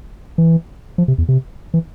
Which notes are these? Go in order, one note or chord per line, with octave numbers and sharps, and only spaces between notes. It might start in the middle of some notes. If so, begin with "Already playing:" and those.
E3
F3
C3
E2
C3
E3